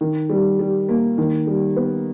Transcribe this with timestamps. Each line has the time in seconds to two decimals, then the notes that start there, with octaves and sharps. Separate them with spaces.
0.01 D#3
0.29 G3
0.59 G3
0.89 A#3
1.18 D#3
1.47 G3
1.76 B3